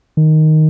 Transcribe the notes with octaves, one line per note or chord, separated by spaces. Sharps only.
D#3